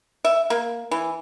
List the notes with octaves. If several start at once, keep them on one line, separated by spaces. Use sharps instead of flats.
E5
A#3
E3